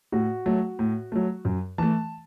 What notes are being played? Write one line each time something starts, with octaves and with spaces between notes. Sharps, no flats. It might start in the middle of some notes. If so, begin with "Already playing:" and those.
A2 F#4
F#3 A3
A2
F#3 A3
F#2
E3 A3 A5